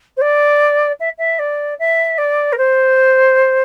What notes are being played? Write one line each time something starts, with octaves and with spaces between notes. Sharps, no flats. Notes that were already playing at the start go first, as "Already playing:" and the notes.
C5
D5
E5
E5
D5
E5
D5
A#4
C5